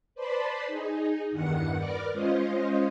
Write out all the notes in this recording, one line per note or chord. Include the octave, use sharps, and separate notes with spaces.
B4 C5 D5 A5 B5 C6
D#4 G#4
E2 G2 D#3 F#5 F#6 C#7
A#4 B4 D5 D6 F6
G#3 C#4 F4 C5 D#5